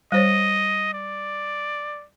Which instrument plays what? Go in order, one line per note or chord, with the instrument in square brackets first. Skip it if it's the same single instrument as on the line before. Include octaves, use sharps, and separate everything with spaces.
[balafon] G3 C5 C#5 [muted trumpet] D#5
[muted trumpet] D5